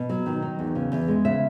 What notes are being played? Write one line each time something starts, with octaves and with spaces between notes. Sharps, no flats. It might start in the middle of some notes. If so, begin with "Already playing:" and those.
Already playing: B2
F#3
D#3
D#4
E2
C#3
E2
G#3
C#3 E5